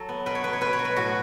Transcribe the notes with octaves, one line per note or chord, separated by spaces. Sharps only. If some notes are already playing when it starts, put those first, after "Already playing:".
Already playing: F#3 A4
B3
B2 B4
C#5
B3 B4
C#5
B2 B4
C#5
F#3
B4
A2 F#4